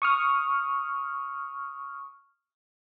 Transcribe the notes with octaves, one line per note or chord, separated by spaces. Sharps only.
C#6 D#6 F6